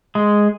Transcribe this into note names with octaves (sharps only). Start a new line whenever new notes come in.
G#3